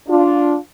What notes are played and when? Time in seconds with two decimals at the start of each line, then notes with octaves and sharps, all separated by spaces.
0.08 D4 F4